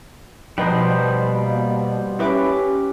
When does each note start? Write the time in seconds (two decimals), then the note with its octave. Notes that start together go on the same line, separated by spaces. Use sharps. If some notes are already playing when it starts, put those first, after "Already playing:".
0.58 B2 F3 G3 B3 D#4 B4 C5 D#5
1.22 A#3
2.19 C#4 E4 G4 B4 D6